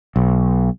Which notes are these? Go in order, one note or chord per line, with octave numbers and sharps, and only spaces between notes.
B1